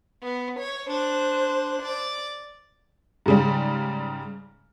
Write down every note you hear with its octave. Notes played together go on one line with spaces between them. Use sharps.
B3
C#5
D4 C5 F#6
D5
G#2 C#3 G3